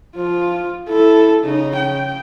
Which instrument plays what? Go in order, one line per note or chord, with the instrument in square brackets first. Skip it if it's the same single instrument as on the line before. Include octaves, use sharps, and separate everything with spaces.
[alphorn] F3 [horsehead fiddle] F4
[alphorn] E4 [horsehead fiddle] A4
[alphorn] C#3 [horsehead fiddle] D#4
[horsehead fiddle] G5